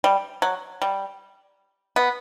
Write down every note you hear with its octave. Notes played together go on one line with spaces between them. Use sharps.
G3
F#3
G3
B3